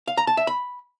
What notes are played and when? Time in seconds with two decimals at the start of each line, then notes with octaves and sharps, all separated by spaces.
0.08 F5
0.17 A#5
0.27 A5
0.37 E5
0.47 B5